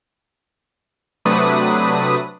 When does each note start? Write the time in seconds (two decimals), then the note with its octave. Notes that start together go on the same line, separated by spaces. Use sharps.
1.25 C3 F#3 A3 D4 B4 D#6